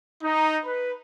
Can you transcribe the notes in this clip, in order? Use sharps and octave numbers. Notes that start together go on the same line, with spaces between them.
D#4
B4